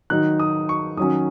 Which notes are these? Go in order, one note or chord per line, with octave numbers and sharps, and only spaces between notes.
D#3 F#3 D#4 F#6
D#6
C#6
D#3 F#3 C#4 D#6